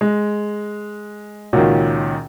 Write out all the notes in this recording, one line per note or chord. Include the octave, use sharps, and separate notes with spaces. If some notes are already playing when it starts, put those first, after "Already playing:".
G#3
C#2 A#2 D#3 C#4 F#4